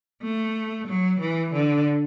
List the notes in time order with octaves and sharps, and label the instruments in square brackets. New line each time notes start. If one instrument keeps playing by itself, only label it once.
[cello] A3
F#3
E3
D3